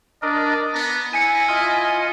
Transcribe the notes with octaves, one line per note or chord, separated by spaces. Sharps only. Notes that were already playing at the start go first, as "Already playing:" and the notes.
D4 A#4 D5 D#5
B3 A#6
E4 G#5 C#7 D#7
F4 D#5 G#5 F6